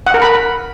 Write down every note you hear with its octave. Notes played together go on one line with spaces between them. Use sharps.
F#5
A#4
B5